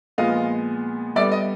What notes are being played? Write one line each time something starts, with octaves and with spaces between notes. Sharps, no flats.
A#2 F3 G#3 B3 D#5 F5
D3 G3 B3 D5 E5
D#5